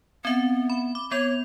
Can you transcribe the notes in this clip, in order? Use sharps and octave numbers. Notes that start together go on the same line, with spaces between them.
B3 C4 E5
B5
D6
B3 C#5 G#6 F7